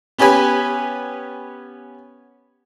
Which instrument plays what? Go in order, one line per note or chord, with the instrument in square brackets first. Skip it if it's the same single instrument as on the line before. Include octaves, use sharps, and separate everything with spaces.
[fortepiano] B3 C#4 G4 B4 G#5 B5